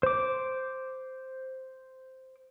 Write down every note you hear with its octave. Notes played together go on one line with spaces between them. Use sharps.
C5 D6